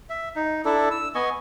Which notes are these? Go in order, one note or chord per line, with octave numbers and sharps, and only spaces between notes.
E5
D#4
D4 E4 A4
E6
B3 D#5 G#5 C#6